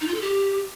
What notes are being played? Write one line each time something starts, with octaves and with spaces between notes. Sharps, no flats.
D#4
F4
A4
G4